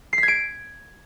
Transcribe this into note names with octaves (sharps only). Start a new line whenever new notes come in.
C7
B6
G#6
D7